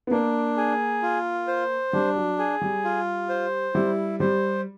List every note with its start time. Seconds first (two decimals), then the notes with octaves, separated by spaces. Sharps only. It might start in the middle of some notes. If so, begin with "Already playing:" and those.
0.07 B3
0.11 A#3 D4
0.57 G#4
1.02 F4
1.47 C5
1.93 G3 D4
2.16 F#3
2.38 G#4
2.61 G3
2.85 F4
3.29 C5
3.74 G3 E4
4.20 G3 C5